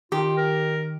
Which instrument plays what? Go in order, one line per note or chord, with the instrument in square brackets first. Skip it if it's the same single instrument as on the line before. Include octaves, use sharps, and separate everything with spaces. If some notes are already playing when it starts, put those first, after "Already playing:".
[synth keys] D#3 [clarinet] F4 [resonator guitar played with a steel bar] G4
[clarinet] A#4